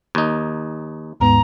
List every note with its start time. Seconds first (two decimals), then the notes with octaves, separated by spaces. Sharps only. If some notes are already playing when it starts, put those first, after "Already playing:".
0.15 D#2 D#4
1.20 D#2 G#2 B3 A#5